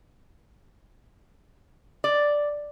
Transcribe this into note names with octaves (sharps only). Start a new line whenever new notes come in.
D5